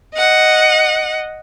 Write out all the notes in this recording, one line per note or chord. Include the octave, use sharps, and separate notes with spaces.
D#5 F#5